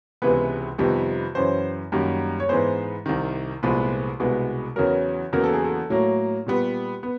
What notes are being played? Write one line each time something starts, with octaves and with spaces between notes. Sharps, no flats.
C#2 C3 E3 G#3 B3 B4
F2 C3 D#3 G3 B3
F#2 C#3 E3 C5
F#2 D#3 G3 A#3
C#5
G#2 E3 G#3 B3 C5
C2 C3 D#3
C2 A#2 F3 G#3 B3 B4
C2 B2 G#3 B3
E2 C#3 F#3 A#4
E2 C#3 F#3 A#3 A#4
A4
G#4
A4
A2 F#3 A#3
A#2 G3 B3
B3